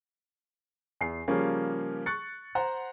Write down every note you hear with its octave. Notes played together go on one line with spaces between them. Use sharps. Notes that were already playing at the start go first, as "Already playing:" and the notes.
E2 C7
C#3 F3 G3 A#3 C#4
C#6 F#6 A6 C#7
C5 F#5 A#5